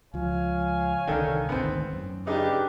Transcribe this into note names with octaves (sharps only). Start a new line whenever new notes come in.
C#2 F3 C#5 F5 G#5
C2 D3 D#3 D4 A4
G#1 D2 D#3 B3 C4
F#2
C#3 D4 D#4 G4 B4